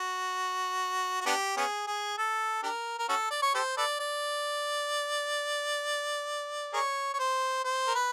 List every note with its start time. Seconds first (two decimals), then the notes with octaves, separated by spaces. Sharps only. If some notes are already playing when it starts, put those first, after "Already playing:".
Already playing: F#4
1.21 F#4
1.26 B3 D4 G4
1.57 B3 C#4 G#4
1.87 G#4
2.18 A4
2.63 D4 G4 A#4
2.99 A#4
3.09 C#4 F#4 A4
3.31 D5
3.42 C#5
3.54 G4 A4 C5
3.77 A4 B4 D5
4.00 D5
6.73 G#4 A#4 C#5
7.14 C#5
7.19 C5
7.64 C5
7.88 A#4
7.95 B4